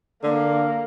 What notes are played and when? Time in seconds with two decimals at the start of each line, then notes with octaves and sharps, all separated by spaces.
0.23 D3 A#3